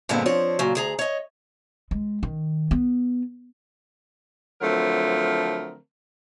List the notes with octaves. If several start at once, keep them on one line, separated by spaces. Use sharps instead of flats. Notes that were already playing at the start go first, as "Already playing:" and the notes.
G2 A#2 D3 G#3 B3 C4
F3 C4 D4 C#5
A#2 C#3 F#3
D2 G#4 A#5
C#5 D#5
G#3
D#3
B3
D3 F3 F#3 A3 C4 A#4